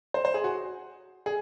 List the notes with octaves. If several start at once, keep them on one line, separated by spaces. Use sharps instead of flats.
C5
C5
G#4
F#4
G#4